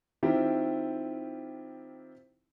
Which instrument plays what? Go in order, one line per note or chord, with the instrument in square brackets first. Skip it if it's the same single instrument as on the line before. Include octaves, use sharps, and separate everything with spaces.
[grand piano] D#3 C4 E4 F4 G4